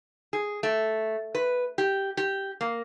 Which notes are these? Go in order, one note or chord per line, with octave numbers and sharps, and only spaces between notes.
G#4
A3
B4
G4
G4
A#3